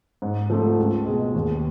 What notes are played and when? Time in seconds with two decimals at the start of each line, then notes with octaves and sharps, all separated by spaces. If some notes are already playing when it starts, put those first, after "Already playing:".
0.22 G#2
0.50 F3 A3 C4
0.78 C#2
1.06 B2 G#3
1.34 D#2